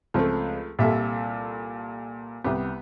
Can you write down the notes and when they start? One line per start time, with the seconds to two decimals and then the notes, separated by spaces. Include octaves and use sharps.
0.14 C#2 F3 A3 C4
0.79 C2 A#2 G4 A4 E5
2.44 C2 C3 B3 G4